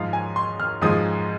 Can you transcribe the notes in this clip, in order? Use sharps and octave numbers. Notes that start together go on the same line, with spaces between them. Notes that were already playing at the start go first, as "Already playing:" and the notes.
Already playing: G#2 F3 G#3 F5
G#5
C6
F6
G#2 F3 G#3 D#6